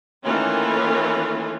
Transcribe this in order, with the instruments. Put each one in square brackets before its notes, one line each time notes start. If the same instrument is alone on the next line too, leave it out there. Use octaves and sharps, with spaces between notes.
[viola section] D#3 E3 A3 A#3 C#4 F4